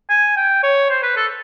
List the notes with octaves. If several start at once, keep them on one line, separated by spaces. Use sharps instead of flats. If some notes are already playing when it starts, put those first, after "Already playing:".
G#5
G5
C#5
C5
B4
A4